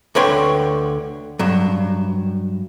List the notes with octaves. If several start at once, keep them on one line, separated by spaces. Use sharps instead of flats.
D2 D3 B4 C#5 G5 C6
G2 F#3